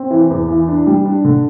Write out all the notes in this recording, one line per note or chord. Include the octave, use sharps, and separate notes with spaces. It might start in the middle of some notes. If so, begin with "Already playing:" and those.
Already playing: C4
E3
E2
E3
D4
G3
D4
D3